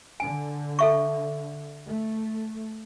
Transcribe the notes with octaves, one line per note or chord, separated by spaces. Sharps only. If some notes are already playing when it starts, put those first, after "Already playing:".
D3 G#5
A4 E5 C#6
A3